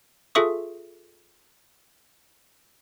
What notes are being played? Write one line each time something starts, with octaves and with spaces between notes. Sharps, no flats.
F4 G#4 A4 E5 C#6 D#6